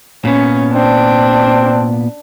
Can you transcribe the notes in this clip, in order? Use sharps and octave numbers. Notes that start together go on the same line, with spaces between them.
A#2 B3 C#4
C4 D4